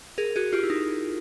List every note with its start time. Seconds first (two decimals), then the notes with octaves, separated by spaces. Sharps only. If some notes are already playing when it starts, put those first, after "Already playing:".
0.18 G#4 A#4
0.36 F#4 G#4
0.53 F4 G4
0.63 E4
0.70 D#4